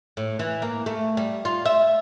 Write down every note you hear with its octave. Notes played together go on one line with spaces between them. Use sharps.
A2
E3
A#3
A3
G3
F4
E5